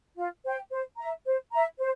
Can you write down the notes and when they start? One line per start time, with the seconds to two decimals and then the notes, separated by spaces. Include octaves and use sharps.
0.17 F4
0.44 C5 G5
0.71 C5
0.98 E5 A#5
1.26 C5
1.52 E5 A#5
1.79 C5